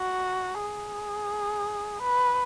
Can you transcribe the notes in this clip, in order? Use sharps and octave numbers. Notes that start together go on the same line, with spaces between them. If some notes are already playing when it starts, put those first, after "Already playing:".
Already playing: F#4
G#4
B4